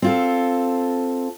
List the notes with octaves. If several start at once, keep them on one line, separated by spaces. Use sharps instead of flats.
C4 F4 A4